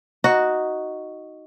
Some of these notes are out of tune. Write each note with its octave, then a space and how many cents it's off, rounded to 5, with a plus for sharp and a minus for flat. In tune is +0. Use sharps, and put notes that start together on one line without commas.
D#4 +0 F#4 +0